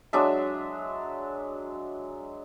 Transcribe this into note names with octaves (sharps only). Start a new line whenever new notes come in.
F#3 G#3 D4 E5